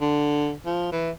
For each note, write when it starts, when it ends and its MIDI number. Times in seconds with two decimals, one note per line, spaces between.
0.01 0.54 50
0.66 0.90 53
0.92 1.11 52